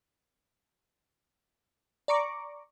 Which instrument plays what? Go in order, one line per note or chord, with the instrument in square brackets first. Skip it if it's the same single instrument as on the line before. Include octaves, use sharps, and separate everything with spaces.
[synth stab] D5 A#5 C#6 D6